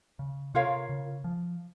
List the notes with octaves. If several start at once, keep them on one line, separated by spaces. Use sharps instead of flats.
C#3
C3 F4 A#4 C#5 F5
C#3
F3